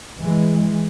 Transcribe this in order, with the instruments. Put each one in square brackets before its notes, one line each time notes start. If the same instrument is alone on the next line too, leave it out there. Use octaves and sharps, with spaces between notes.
[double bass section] E3 G#3